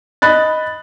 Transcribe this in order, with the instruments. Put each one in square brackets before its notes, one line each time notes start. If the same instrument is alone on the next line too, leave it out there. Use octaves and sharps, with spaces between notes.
[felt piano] D#5 B5 F#6 A6